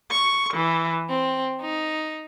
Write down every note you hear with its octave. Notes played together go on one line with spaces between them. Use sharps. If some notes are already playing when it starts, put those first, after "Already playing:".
C#6
E3
C4
D#4